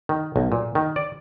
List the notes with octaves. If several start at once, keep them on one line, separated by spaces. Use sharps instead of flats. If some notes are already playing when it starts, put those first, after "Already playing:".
D#3
B1
A#2
D#3
D5